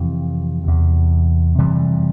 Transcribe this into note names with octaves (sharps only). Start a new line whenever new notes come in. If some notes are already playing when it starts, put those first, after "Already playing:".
Already playing: F2 C3 E3
E2 C3
F2 C3 E3 G3